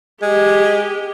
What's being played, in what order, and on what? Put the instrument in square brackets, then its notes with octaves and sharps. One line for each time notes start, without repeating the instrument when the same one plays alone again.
[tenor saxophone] G#3 [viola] G4